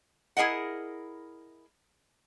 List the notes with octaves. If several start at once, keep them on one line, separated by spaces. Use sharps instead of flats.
E4 G#4 A#4 D#5 F#5